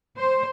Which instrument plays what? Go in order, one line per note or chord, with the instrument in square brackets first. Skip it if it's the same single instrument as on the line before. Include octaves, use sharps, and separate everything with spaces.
[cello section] C5